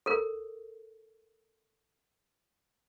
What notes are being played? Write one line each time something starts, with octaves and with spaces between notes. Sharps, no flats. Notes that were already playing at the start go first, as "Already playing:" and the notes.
A4 A#4